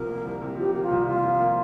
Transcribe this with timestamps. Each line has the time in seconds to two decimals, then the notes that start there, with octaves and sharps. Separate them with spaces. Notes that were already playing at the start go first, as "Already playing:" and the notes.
Already playing: C2 C3 F3 A#4
0.09 A#3
0.25 C2
0.41 C3
0.57 F3 G4
0.73 A#3 G4
0.82 F4
0.91 C2
1.07 C3 F4
1.23 F3
1.40 A#3